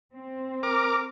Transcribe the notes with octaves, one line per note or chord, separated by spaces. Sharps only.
C4
A#4 D6